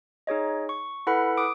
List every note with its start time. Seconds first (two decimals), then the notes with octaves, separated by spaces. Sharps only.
0.27 D#4 G#4 C#5 D#5
0.69 C#6
1.07 E4 A4 B4 F#5 B5
1.37 D6 D#6 D7